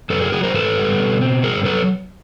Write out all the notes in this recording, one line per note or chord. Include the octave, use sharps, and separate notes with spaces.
F#2 A4 B4
G#4 A#4
F#3 F#4 G#4
A#4 C5
G#2 A4 B4
G3
B2
C4
G2 G#4 A#4
F#3 A4 B4